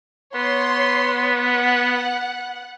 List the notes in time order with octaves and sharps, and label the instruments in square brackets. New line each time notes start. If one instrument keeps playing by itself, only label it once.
[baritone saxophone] B3 [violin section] C#5 C6
[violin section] F#5